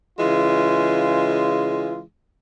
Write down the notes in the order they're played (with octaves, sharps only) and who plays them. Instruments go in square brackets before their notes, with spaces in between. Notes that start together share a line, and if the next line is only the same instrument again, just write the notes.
[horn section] C#3 E3 G#3 F4